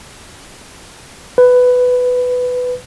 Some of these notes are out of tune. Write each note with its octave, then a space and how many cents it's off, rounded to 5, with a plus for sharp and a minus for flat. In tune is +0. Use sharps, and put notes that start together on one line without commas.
B4 +10